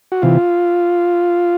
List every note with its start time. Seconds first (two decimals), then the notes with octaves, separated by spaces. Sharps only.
0.12 F#4
0.22 C3 E3 F4